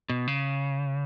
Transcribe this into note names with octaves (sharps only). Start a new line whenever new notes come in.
B2
C#3